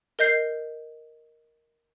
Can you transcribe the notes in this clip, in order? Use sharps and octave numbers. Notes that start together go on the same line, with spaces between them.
A#4 D#5 G6 C7